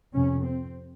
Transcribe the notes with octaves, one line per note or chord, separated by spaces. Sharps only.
F2 C3 C#4
C4